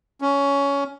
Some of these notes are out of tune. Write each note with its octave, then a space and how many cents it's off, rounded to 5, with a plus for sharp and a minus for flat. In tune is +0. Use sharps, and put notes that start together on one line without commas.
C#4 +15